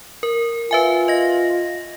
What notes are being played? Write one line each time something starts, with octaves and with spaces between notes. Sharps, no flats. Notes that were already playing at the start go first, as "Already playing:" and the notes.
A#4
F4 B4 E5 G#5
D#5 A#6